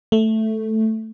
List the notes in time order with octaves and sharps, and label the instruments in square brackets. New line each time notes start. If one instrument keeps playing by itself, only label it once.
[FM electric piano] A3